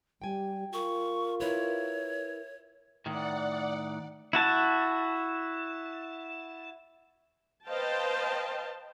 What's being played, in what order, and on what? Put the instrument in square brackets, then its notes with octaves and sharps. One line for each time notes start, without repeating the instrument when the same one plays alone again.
[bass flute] G3 [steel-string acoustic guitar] G5 G#5
[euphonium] F4 [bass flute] A#4 [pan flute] C#6
[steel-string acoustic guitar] E4 B4 [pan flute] C#5
[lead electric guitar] A2 D#3 [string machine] D5 F#5
[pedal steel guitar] E4 F#4 A5
[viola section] B4 C5 D#5 F5 G5 A5